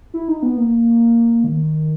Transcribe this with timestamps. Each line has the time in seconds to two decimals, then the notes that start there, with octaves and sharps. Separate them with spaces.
0.14 E4
0.28 D#4
0.43 B3
0.57 A#3
1.44 D#3